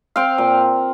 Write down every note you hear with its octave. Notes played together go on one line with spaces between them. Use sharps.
C4 F5 G5
A#2